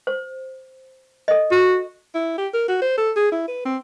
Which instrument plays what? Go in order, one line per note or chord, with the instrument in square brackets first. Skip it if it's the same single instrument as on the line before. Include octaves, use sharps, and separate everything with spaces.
[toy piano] C5
A4 D#5
[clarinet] F#4
[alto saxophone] E4
G4
A#4
F#4
C5
A4
G#4
E4
B4
C4